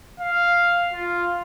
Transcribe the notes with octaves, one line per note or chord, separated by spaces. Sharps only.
F5
F4